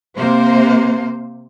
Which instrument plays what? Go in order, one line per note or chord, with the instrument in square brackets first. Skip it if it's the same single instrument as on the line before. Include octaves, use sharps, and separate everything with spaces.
[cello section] C3 A#3 C5